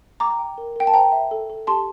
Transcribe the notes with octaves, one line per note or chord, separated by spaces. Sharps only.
G5 A#5 D6
G5
A#4
A#4 G5
A5
C5 G5 A#5
E5
A4
A4
G4 A5 C6